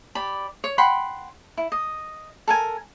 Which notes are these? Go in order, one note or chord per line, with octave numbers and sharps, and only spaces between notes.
G4 D5 B5
C#5
F#5 G5 B5 C6
E4
D#5
A4 A#4 G#5